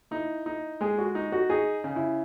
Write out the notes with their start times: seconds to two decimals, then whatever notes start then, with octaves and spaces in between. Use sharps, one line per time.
0.11 D#4 E4
0.46 D#4
0.81 G#3 G#4
0.98 F#4
1.15 D#4
1.32 F#4
1.50 D#4 G#4
1.84 C#3
1.96 E4